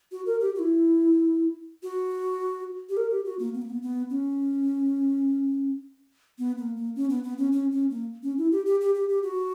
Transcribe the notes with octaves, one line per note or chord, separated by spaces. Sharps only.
F#4
A#4
G4
F#4
E4
F#4
G4
A#4
G4
F#4
A#3
B3
A#3
B3
B3
C#4
B3
A#3
A#3
C#4
B3
B3
C#4
C#4
C#4
A#3
C#4
E4
G4
G4
G4
G4
G4
F#4